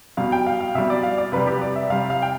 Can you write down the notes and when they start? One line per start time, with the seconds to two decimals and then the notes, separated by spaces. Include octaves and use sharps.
0.17 B2 G3 F5
0.32 G5
0.47 F5
0.61 F5
0.75 B2 G3 E5
0.90 D5
1.03 F5
1.18 D5
1.32 C3 G3 B4
1.47 G4
1.61 D5
1.76 E5
1.90 C3 G3 F5
2.10 F5
2.22 G5